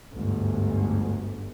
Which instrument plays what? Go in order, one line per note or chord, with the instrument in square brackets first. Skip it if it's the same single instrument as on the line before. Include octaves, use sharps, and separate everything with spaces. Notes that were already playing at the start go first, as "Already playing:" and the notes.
[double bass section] G1 D2 G#2